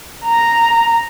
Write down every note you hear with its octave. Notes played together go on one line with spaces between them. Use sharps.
A#5